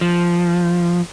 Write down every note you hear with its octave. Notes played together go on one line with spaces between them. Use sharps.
F3